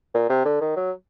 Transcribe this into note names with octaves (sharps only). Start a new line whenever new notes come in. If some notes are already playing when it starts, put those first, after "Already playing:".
A#2
C3
D3
D#3
F#3